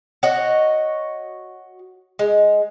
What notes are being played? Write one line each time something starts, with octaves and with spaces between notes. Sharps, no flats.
F#4 C#5 D#5 F#5
G#3